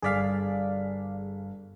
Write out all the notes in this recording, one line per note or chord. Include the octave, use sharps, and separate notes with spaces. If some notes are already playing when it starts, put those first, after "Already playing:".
G1 G#4 D5 F5 B6